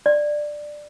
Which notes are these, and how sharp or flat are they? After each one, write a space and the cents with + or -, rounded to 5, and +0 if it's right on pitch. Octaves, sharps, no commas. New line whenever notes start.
D5 +10